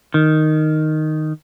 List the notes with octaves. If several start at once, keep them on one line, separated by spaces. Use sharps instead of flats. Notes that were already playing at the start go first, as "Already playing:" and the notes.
D#3